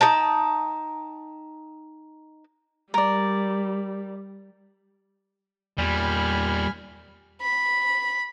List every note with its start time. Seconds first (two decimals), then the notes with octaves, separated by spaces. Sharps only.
0.01 D#4 G5 A5
2.94 G3 A#4 D5
5.78 E2 A#2 G3 G#5 B5 F6
7.41 B5